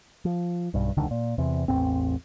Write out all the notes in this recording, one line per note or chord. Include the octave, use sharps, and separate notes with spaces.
F3
B1 G2
E1 C#2 D3 D#3
A#2
E2 C3
A1 E2 G#2 C4